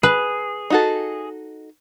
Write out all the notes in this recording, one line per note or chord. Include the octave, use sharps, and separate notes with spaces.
G#4 B4
D#4 F#4 A4